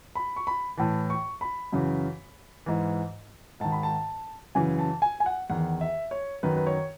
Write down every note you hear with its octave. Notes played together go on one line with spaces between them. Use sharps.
B5
C#6
B5
A2 E3 A5
C#6
B5
F#2 C#3 E3
G#2 E3
G#2 D#3 A5
B5
A5
F#2 C#3 E3 G#5
A5
G#5
G#5
F#5
E2 D#3 F#5
E5
C#5
F#2 D#3 B4
B4
C#5